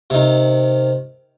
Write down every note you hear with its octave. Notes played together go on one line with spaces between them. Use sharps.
C3 D#3